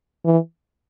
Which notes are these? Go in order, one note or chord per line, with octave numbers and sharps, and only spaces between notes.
E3